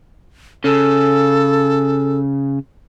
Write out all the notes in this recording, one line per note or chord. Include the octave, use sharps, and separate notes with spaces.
C#3 A4